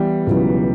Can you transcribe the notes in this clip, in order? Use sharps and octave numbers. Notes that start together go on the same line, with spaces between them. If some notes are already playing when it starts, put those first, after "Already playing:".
Already playing: E3 G3 B3 E4
C#2 B2 F#3 B3 E4